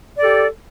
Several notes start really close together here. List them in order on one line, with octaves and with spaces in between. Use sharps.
D5 A4 G4